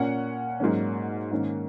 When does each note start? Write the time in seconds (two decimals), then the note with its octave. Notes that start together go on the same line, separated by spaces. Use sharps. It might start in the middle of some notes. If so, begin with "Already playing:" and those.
Already playing: A#2 A#3 C#4 F#5
0.60 G#2 F#3 A#3 C#4
1.31 G#2 D#3 A#3 C#4